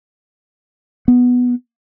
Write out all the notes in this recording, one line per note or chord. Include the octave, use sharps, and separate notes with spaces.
B3